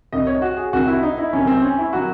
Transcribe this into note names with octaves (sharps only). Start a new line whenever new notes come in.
C2 C3 D#3 D#5
C#5
F#4
G#4
C2 C3 D#3 F#4
E4
D#4
E4
C2 C3 D#3 F#3 C#4
C4
C#4
E4
C3 D#3 F#3 F#4